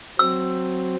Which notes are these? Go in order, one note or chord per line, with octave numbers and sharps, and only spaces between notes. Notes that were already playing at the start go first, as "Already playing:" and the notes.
F#3 C4 E6